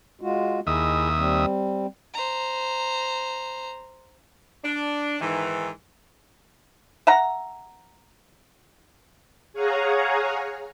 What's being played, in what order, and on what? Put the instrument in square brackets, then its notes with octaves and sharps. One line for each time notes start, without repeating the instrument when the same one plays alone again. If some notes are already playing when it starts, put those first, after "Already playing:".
[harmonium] G#3 F4 F#4
[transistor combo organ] D#2 E5 D#6 [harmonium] E4 G#4 D#5
[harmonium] G3 C4
[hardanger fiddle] C5 A#5
[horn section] D4
G#2 D#3 E3
[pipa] E5 F#5 A#5
[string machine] G#4 C#5 F5 F#5 G#5 A#5